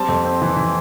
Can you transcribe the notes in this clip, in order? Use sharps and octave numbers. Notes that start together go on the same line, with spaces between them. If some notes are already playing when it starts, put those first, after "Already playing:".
Already playing: G3 C4 A5
F2
C4
E3
E3